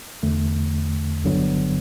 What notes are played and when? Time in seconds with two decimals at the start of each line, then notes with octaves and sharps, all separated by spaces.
0.23 E2 D3 A3
1.23 G1 G2 D3 F#3 B3